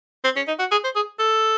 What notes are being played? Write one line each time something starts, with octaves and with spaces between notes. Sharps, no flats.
C4
C#4
D#4
F#4
G#4
C5
G#4
A4